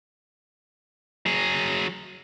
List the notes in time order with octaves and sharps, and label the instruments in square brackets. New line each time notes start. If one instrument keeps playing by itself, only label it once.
[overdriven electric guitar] F#3 G#4